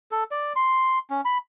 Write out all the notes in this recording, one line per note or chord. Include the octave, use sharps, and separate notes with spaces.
A4
D5
C6
C#4
B5